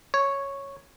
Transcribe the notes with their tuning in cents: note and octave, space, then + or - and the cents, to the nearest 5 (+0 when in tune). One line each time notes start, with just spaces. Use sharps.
C#5 -5